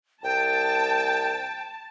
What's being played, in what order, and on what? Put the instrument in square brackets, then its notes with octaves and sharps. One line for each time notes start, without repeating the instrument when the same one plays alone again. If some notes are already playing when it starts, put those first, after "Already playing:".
[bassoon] C2 [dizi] G5 [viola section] A5